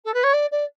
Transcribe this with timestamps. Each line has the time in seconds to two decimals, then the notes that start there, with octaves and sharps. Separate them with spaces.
0.05 A4
0.14 B4
0.23 C#5
0.33 D5
0.51 D5